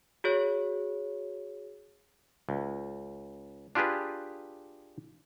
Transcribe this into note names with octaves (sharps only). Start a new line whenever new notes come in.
F#4 G#4 C#5
C#2
D4 F4 G4 G#4 B4